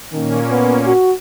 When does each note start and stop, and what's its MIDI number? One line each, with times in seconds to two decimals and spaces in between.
0.12 0.93 46
0.12 0.40 51
0.12 0.93 58
0.12 0.93 61
0.51 0.78 59
0.86 1.12 66